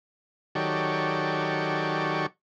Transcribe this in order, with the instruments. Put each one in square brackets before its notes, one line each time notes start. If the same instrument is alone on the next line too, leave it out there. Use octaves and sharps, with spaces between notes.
[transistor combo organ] D#3 F#3 G4 A4 C#5 D5